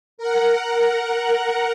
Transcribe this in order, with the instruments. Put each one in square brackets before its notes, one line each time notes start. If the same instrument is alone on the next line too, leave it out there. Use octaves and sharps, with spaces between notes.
[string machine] A#4 F#5